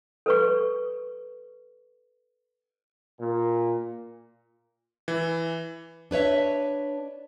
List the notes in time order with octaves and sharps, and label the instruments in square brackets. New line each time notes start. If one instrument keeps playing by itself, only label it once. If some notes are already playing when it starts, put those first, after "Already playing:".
[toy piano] A4 B4 C#6
[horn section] A#2
[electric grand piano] E3
[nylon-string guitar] D4 B4 C#5 E5